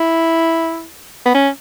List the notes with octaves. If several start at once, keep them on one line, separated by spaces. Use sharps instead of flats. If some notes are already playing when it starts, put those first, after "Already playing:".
Already playing: E4
B3
C#4